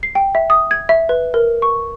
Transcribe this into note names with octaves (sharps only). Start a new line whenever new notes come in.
C7
G5
E5
D#6
G#6
E5
B4
A#4
C#6